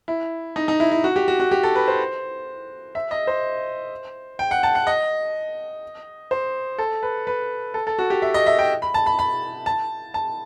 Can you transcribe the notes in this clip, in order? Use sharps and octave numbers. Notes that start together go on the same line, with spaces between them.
E4
D#4
D#4
E4
E4
F#4
G4
F#4
F#4
G4
A4
B4
C5
E5
D#5
C5
G5
F#5
A5
F#5
D#5
C5
A4
B4
B4
A4
A4
F#4
G4
E5
D#5
E5
G5
B5
A5
B5
B5
A5
A5